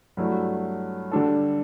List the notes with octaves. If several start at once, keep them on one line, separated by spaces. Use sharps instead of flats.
G2 F#3 A3 E4
D3 G3 D4 A4